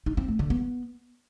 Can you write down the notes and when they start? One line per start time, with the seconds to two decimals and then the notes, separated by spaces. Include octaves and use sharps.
0.06 D#4
0.17 C4
0.28 A3
0.39 D3
0.50 B3